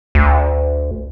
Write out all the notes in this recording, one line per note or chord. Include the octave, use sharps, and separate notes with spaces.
D2